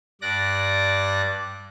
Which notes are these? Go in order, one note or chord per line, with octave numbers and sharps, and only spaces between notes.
G2 D5 D6 F#6 A#6